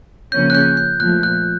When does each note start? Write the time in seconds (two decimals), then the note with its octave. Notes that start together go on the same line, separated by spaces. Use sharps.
0.32 C#3 F3 A#3 C#4 G6
0.50 F#6
0.55 G6
0.77 G6
1.00 A#2 F3 A3 F#6
1.23 F#6